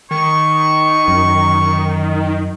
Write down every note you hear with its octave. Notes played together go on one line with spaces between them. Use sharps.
D#3 C#6
F#2